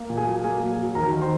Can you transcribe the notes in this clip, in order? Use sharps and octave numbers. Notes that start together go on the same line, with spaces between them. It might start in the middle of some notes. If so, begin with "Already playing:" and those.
Already playing: A#3
A#2
G#4 G#5
F#3
A#3 G#4 G#5
F#3
F#3
D#2 A#4 A#5
D#3
C5 C6